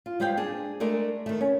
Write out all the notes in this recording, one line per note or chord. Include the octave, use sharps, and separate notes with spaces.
F4
G3 G#3 B4 C5 F5 G5
D4 G#4
G#3 A3 D4 A#4
D#3 A3
C#4